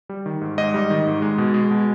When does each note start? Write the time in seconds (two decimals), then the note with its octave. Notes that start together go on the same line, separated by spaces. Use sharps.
0.09 G3
0.26 D#3
0.41 G#2
0.58 G#2 D#5
0.74 G3
0.90 D#3
1.06 G#2
1.22 G#3
1.38 B2
1.54 G#3
1.71 B2